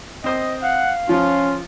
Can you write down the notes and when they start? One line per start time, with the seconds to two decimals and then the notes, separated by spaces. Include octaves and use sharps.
0.24 C4 C5 D#5 D#6
0.63 F5 F#5
1.09 F3 C#4 F4